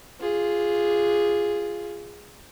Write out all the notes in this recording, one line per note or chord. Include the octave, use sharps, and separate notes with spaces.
F4 G#4